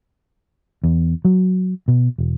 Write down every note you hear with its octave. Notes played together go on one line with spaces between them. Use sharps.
E2
F#3
B2
E1